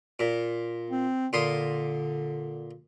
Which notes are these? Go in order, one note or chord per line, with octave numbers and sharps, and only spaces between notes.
A#2
C4
A#2 D3 C6 D#6